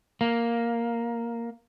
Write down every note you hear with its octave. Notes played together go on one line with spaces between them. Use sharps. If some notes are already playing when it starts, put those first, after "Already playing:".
A#3